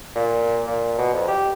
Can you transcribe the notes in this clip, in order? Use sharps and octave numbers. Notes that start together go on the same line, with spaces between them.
A#2
A#2
B2
F2
G4